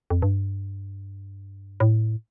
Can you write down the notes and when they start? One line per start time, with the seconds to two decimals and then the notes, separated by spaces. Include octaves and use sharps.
0.10 F2
0.22 G2
1.80 A2